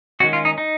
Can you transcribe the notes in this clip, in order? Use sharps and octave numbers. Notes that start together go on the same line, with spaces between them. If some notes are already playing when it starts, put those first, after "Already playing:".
D#3 G#3 C#4 F#4
F4
D#4
D#4